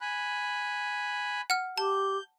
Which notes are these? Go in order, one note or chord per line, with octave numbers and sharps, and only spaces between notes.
G#5 B5 F#6
F#5 F6
G4 A5 G6